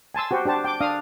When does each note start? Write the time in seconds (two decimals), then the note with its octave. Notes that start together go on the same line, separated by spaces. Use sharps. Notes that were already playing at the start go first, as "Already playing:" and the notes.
0.14 G#5 A5 C6 E6
0.31 F#4 G4 C5
0.45 D4 G4 C5 A5
0.64 G5 D6
0.80 D4 F5 D#6